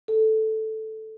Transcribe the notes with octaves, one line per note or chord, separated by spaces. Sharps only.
A4